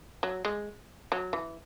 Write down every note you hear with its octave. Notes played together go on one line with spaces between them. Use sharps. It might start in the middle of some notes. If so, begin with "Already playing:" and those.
F#3
G#3
F#3
E3